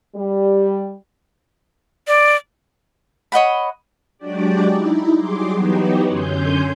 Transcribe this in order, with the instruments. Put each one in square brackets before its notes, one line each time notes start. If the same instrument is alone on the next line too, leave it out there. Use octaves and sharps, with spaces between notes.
[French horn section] G3
[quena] D5
[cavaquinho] C#5 D#5 F#5 B5
[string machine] F#3 G#3 D4 F#4 G4 D5
D#4 E4
F#3 G3 G#4 C6 D6
E3 F#3 B3 D#4 F#4 G4
F#2 D3 C#4 G#5 C6 G6